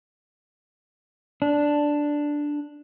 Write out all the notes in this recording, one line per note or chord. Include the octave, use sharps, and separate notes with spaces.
D4